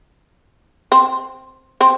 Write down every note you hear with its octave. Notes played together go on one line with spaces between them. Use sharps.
C4 C5
C4 C5